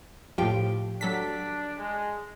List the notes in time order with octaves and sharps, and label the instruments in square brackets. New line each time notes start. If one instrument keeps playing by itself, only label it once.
[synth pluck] A2 F3 [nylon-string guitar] G4 F5 G5
[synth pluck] F#3 A4 B6 [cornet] D4
[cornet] G#3